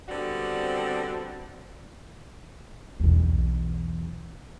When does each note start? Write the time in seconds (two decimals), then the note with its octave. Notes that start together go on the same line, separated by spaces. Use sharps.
0.09 D3 G3 B3 C4 F#4
3.00 B1 E2